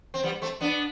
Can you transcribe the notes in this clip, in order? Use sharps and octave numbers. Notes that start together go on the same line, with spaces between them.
C4
G3 B3
A3 C4
B3 D4